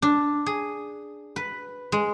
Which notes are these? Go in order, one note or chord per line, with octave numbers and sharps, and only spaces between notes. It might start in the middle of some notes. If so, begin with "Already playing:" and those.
D4
G#4
B4
G#3